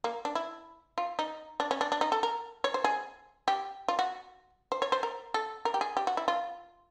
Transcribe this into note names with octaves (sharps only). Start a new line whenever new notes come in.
A#3
D4
E4
F4
D#4
D4
C#4
D4
D4
D#4
A4
A#4
C#5
C5
G#4
G4
F4
F#4
C5
C#5
C5
A#4
A4
A#4
G4
G#4
G4
F#4
E4
F4